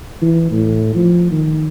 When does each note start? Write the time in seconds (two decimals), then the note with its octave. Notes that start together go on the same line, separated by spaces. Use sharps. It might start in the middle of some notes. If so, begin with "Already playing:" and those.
0.22 E3
0.51 A2
0.95 F3
1.31 D#3